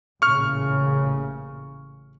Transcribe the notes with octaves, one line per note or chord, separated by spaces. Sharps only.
A1 A#2 C#3 C#6 F6